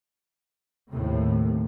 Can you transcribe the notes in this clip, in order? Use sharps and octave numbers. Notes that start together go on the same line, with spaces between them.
D#2 A2 C3